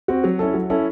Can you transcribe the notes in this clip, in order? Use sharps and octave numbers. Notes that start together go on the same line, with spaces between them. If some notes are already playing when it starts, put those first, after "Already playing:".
C4 F#4
F#3
C#4 E4 A4
F#3
C#4 E4 A4